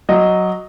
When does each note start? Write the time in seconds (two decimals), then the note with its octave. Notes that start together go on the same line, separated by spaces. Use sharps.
0.09 F#3 D#5